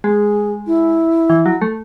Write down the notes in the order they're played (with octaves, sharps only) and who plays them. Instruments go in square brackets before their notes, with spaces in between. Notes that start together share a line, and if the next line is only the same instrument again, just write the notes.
[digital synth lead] G#3 [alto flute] G#4
[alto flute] E4
[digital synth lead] E3
F#3
A3